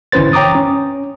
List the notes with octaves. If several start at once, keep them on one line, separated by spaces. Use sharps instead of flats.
G1 E3 C#4 B4 C5 A6
C#5 G5 A#5 D6 D#6
C#4